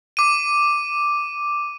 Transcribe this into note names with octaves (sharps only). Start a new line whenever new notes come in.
D6 D#7